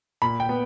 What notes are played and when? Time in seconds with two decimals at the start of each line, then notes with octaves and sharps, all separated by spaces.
0.22 A#2 B5
0.40 G5
0.49 B3